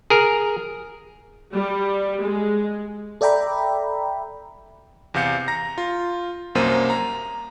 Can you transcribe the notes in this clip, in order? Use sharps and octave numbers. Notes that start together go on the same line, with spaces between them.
G#4 A#4
G3
G#3
A4 D5 E5 G5 A#5 B5
E2 C3 F5 G6 C#7
A#5 A#6
F4
C2 F#2 A#3 C5 D#7
A#5